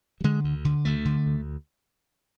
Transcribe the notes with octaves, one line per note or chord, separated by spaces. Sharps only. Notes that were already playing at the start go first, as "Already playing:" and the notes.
F#3
D3 G#3
D2
D3
D2 A3
D3
D2